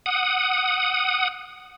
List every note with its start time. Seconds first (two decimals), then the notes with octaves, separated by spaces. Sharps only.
0.06 F#5 D#6